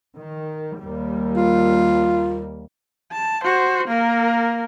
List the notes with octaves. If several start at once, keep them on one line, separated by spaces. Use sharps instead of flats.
D#3
D#2 G3 A#3
F4
A5
F#4 C5
A#3 A#4